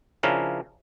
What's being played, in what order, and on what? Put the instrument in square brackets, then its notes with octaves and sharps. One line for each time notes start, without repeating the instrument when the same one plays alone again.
[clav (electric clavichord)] C#3 F3 C#4 D4 E4 A#4